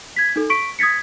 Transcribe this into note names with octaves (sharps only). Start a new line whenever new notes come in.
G#6 B6
D#4 A4
C#6 B6 D7
D#6 G#6 A6 B6 C#7